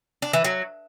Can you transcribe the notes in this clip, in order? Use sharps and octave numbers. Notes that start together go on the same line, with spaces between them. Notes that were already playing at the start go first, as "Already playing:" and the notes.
D4
E3
F#3